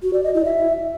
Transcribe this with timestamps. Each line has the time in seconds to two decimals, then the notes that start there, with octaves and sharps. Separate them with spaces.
0.03 F#4
0.13 D5
0.24 D#5
0.34 E4
0.45 E5